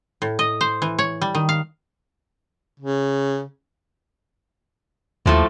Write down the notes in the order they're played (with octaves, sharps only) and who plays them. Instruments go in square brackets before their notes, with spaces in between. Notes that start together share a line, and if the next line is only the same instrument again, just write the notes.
[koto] A2
D#5
C5
E3
C#5
G3
D#3
F5
[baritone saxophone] C#3
[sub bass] D#2 [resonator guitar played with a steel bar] A2 F3 A3